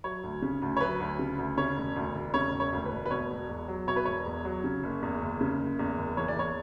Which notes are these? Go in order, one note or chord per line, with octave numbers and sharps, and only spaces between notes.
F#3 C#5
D2
C#3
D2
C#5
F#3 B4
D2
C#3
D2
C#3 C#5
E1
D2
E1
C#3 C#5
E1
C#5
D2
B4
E1
B4
B2 C#5
E1
E2
F#3
B2 C#5
B4
E1 C#5
E2
F#3
C#3
F#1
E2
F#1
C#3
F#1
E2
F#1
E3 C#5
D5
E2 C#5